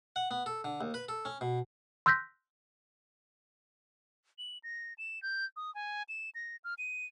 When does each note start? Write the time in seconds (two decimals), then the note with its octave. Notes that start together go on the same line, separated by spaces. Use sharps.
0.16 F#5
0.31 B3
0.46 A4
0.64 D3
0.81 D#2
0.94 B4
1.09 A4
1.25 C#4
1.41 B2
2.06 C6 E6 F#6 G6 A#6 B6
4.38 F#7
4.64 A#6
4.98 E7
5.22 G6
5.56 D#6
5.75 G#5
6.09 E7
6.35 A#6
6.64 F6
6.78 D#7